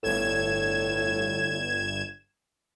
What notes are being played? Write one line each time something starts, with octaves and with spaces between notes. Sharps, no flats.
G1 A2 G#6 E7